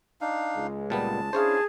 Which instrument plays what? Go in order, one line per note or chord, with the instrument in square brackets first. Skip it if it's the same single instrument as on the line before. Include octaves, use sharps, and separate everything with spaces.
[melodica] D4 D#4 F5
[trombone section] C#2 G#3
[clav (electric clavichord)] A#2 G3 B3 [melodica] A5
[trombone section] C#4 D4 E4 [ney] G#4 [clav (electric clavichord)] C5 C#5 F5